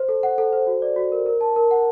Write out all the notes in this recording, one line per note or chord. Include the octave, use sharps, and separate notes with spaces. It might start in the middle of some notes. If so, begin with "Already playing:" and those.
Already playing: C5
A4
F#5
A4
C5
F#4
D5
F#4
A#4
A#4
A5
A#4
F#5